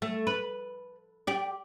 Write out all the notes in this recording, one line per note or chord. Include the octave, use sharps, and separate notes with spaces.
A3
B4
G4 D5